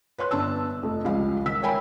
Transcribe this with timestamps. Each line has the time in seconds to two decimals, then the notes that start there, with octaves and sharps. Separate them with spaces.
0.18 B4 C#5 C6 F#6
0.31 G1 D4 A5 E6
0.83 F1 F2 A3
1.05 C#2 F3 G3 G#3 F5
1.46 D#3 E6 B6
1.62 A#4 C#5 E5 G5 G#5 B5